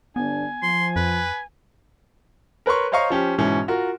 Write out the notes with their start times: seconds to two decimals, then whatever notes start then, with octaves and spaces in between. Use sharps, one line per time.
0.16 G1 B3 D4 G#5
0.63 F3 C6
0.96 F2 B4
2.66 A#4 B4 C#5 C6 C#6
2.92 C5 C#5 D#5 F5 A#5 C#6
3.10 F3 C#4 G4
3.38 G#2 B2 E3 C#4
3.68 F4 F#4 A#4